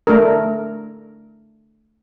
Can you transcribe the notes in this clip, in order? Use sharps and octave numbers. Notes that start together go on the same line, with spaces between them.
A3 D4 A#4